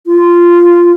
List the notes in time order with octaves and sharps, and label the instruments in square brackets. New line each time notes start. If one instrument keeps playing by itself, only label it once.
[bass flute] F4